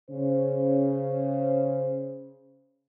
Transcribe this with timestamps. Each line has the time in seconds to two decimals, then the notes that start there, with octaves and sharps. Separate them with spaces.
0.10 C#3 C#4 C5